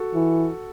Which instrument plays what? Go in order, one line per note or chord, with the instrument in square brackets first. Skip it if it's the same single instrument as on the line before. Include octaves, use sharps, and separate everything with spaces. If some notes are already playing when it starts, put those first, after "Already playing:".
Already playing: [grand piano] F#4 A4
[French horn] E3